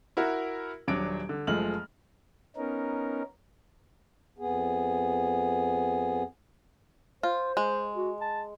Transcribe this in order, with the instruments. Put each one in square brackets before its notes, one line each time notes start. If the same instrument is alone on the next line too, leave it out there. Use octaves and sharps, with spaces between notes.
[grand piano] E4 F#4 A#4
D#1 F#3 D4 D5 D7
D3
F#1 F3 G#3 A3 F6 F#7
[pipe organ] B3 C#4 D#4 A#4
[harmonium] F2 B3 G#4
[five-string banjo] F4 [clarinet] C5
[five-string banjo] G#3
[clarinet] F#4
A5